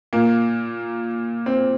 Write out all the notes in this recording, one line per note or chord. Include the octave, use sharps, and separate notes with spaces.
A#2 A#3
C4